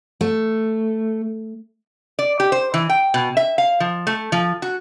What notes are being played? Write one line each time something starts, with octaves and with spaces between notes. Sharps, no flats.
A3
D5
G4
C5
E3
G5
B2
E5
F5
F3
A3
F3
F#4